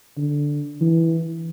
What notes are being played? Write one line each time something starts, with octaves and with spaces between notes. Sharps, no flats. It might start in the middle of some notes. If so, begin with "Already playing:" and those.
D3
E3